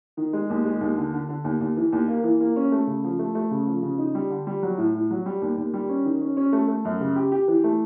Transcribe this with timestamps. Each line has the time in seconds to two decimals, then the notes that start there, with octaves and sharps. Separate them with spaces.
0.17 D#3
0.33 G#3
0.50 D#2
0.65 G#3
0.81 D#2
0.97 D3
1.13 D3
1.29 D3
1.44 D#2
1.60 D#2
1.77 E3
1.92 D#2
2.08 A#3
2.24 E3
2.40 A#3
2.56 C#4
2.72 A3
2.87 C#3
3.04 F3
3.19 A3
3.35 A3
3.51 C#3
3.67 F3
3.82 C#3
3.98 D#4
4.15 G3
4.30 D3
4.47 G3
4.63 F#3
4.77 A2
4.94 A2
5.10 F#3
5.26 G3
5.42 D#2
5.58 D#2
5.74 G3
5.89 C#4
6.05 D#3
6.21 C#4
6.37 C#4
6.53 A3
6.68 A3
6.85 F#2
7.01 C#3
7.16 G4
7.32 G4
7.48 E3
7.64 A3